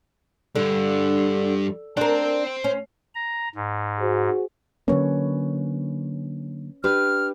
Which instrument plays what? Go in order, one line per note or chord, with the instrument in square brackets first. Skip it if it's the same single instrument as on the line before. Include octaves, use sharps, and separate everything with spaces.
[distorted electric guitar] G2 [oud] D3
[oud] D4 A#4 [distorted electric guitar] C5 G5
[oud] C#4
[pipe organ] A#5
G#2
[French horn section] F#4 G#4 C5
[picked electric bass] D3 F#3 A#3 [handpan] C#4 B4 C#5
[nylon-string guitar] D4 G4 B4 [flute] F6